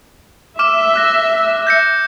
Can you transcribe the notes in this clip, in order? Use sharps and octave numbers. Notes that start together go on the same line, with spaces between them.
E5 D6 F6 E7
D6 F#6 A#6
G6 A#6 C#7